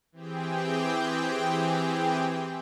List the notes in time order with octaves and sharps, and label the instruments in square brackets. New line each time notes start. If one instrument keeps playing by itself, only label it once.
[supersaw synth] E3 C4 G4 G#4 G5